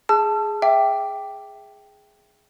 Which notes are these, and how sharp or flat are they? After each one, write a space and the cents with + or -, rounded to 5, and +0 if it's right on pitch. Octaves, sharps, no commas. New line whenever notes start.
G#4 +0 A5 +0 E6 +45
E5 +0 G5 +0 D6 +0